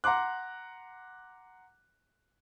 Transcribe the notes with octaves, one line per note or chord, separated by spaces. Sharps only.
F#5 A#5 C6 D6 F#6